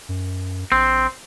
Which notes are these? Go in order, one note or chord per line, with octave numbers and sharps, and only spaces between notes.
F#2
A#1 C4